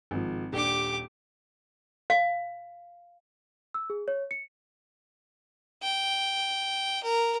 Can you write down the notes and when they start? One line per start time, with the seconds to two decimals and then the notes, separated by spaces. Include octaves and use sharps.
0.11 G#1 F3
0.53 D#1 D4 G4 D6
2.10 F5
3.74 E6
3.90 G#4
4.08 C#5
4.31 C#7
5.82 G5
7.03 A#4